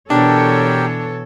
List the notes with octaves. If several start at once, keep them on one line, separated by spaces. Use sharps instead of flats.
B2 E3 D4 G4 A4 A#4 C#5 G5